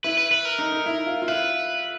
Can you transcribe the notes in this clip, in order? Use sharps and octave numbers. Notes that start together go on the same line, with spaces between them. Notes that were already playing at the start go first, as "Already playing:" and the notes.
E4 B4
B4
B4
A#4
D#4
D#4
E4
F4
F4
E4 B4